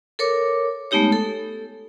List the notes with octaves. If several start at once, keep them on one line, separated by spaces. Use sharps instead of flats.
A4 A#4 C#5 D6
G#3 A3 B3 D#4 G4 C#5
A4